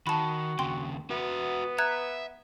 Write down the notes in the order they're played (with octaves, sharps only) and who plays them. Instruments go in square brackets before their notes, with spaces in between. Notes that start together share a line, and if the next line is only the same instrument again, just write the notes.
[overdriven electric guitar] D#3 [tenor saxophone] F#4 [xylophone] A5 B5
[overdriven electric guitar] D#2 C#3 [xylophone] G5 C6
[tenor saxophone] B3 [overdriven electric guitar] F#4 E5
[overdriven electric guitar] E5 [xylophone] A#5 F#6 G#6